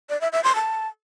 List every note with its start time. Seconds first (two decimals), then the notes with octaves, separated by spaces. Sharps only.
0.10 D5
0.21 E5
0.32 E5
0.44 C6
0.55 A5